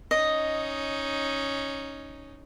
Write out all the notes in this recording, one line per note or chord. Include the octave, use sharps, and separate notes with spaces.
C#4 D#4 D#5